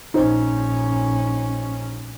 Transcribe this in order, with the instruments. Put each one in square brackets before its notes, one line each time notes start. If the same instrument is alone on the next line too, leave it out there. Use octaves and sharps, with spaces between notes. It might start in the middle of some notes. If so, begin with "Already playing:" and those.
[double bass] A#1 C#4 [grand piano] D#4 C5